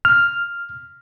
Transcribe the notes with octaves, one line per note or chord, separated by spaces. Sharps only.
F6